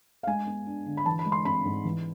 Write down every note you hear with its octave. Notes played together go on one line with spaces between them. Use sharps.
F5
G#3 G#5
B3
D4
D3
B5
E3 A5
B5
G#3
C6
C4 B5
G#2
E3